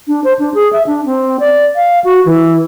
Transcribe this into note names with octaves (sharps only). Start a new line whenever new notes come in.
D4
C5
D4
G#4
E5
D4
C4
D5
F5
F#4
E3